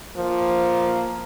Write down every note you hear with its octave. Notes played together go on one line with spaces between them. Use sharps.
F3 A#3